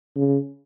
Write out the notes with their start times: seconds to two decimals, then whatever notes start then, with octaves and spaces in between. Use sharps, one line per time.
0.16 C#3